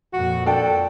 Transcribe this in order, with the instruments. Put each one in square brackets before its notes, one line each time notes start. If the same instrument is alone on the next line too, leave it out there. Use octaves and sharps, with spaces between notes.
[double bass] F2 A#2 [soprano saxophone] F#4
[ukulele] D4 G5 [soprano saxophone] A4